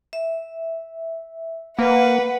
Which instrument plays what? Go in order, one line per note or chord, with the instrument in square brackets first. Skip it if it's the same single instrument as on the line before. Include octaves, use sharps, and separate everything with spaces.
[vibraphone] E5
[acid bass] A#3 [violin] B4 F#5